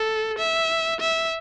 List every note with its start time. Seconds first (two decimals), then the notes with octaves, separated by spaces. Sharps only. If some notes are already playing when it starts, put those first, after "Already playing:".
Already playing: A4
0.38 E5
1.00 E5